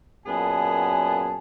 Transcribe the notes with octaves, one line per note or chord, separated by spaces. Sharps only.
F#2 A#2 B3 G#4 G#5 A5